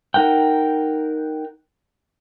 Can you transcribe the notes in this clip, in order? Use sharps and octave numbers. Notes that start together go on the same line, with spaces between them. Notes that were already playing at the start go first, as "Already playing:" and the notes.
D#4 A#4 F#5 G5